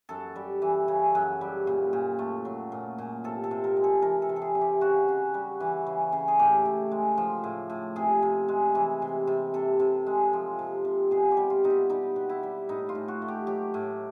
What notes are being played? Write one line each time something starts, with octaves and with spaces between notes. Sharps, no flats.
F#2 A4
G3
E3
C#3
F#2
G3
A#2
A#2
A3
F#3
A#2
A#2
C3 A4
A4
C3
A#4
G#3
A4
E3 A#4
A4
C3
A4
G#4
C3
G4
C#3 F#4
C#3
G3
E3
C#3
C#3
G#4
A2 G4
A2
G#3
F3
A2
A2
C3 G#4
C3
G#3
E3
C3
C3
C3 A4
C3
G#3
F3
C3
C3
B2 G#4
G4
G3
F4
B2 D#4
E4
G3 D#4
B2
E4
G3
A2 D#4
F4
A2
F#4
A3
G4
F#3 G4
A2